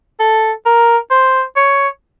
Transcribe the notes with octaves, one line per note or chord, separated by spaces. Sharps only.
A4
A#4
C5
C#5